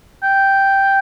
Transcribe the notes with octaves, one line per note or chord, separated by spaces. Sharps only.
G5